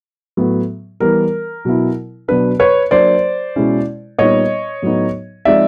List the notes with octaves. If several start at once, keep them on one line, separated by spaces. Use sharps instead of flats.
A2 F#3 B3
E3 G3 B3 A#4
B2 F#3 B3 E4
B2 F#3 B3 D4 B4
B4 C#5
F#3 A#3 D4 C5 D5
B2 G#3 C#4 E4
A#2 G3 B3 D#4 C#5 D#5
A2 F#3 B3 D#4
F3 G#3 C4 D#4 D5 E5